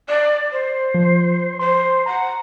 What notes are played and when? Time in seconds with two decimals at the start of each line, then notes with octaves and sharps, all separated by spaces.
0.09 D5
0.52 C5
0.94 F3
1.59 C5 C6
2.06 F#5 A#5